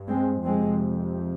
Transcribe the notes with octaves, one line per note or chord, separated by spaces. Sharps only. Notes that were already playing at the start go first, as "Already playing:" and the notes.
Already playing: G2
G#3 C4
F2 C3 G#3 C4